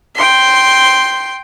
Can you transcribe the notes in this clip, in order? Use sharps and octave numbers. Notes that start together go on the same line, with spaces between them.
G5 C6